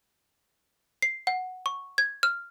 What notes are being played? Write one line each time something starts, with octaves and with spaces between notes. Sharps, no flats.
C7
F#5
C#6
G#6
F6